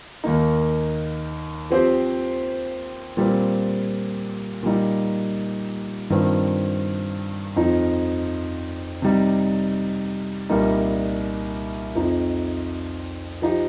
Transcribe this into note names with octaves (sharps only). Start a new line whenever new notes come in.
D#2 D#3 A#3 D#4
F3 C4 G4 C5
A#2 G3 C4
A#2 G3 D#4
G2 D#3 C4 F4
F2 F3 D#4
C3 G3 D#4
C2 A#2 G3 D#4 A#4
F2 F3 D#4
F3 D#4 G4